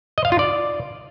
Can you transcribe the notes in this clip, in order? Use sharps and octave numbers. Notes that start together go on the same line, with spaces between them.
D#5
F5
F4
D5